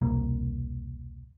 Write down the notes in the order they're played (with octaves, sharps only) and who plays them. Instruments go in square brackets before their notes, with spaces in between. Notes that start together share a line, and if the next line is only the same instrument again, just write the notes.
[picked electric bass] E1 C2 A#3